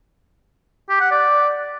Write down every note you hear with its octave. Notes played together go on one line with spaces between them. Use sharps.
G4
F#5
D5